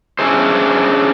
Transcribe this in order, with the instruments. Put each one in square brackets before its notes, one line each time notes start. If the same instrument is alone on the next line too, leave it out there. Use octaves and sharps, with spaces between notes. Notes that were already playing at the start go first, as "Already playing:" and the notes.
[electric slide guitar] C#4 D4 E4 G#4 C5